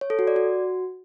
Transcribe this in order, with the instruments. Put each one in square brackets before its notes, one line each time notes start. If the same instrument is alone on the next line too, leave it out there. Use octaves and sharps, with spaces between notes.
[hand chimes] C#5
A4
F#4
D5
F#4